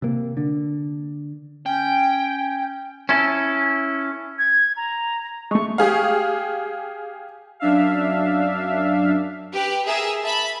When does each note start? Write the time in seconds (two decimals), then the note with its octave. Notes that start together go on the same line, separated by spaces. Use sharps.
0.02 C3 A#3
0.37 D3
1.66 C#4 G5
3.09 C#4 E4 A4
4.38 G#6
4.77 A#5
5.51 G#3 A3 C#6
5.78 G4 G#4 F5
7.60 F#2 D4 E5 F5
9.53 G4 B4
9.84 G#4 A#4 E5
10.22 E5 A5 B5